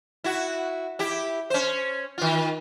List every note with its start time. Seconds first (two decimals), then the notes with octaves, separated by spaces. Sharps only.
0.24 E4 F#4
0.99 E4 G4
1.50 C#4 C5
2.18 D#3 F4